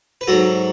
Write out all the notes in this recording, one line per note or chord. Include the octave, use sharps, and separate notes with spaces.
B4
G#2 F#3 F#4 A4